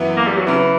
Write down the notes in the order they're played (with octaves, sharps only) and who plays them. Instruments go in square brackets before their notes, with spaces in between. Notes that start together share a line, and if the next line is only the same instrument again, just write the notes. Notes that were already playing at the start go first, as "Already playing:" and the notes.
Already playing: [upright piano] F#2 E3 B3 E4
[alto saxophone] A#3
G3
F#3
[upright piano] C#3 F#3 C#4 [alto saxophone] E3